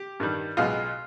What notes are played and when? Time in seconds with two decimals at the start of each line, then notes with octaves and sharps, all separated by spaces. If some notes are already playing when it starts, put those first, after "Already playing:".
Already playing: G4
0.20 G2 D#3 G3
0.57 B1 B2 G#3 F4